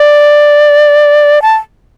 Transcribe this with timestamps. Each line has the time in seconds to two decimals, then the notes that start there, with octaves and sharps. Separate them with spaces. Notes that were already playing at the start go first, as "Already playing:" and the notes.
Already playing: D5
1.42 A5